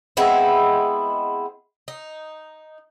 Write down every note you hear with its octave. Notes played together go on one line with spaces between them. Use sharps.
G#3 B3 C4 E4
D#4